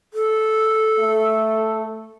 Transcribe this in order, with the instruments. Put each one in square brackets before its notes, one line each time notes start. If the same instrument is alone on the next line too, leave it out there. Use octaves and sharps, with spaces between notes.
[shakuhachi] A4
[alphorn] A3